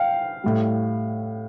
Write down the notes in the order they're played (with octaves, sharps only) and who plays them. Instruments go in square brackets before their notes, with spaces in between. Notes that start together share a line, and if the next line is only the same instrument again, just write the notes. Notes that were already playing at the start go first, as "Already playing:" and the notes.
Already playing: [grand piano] F5 G5
A2 G3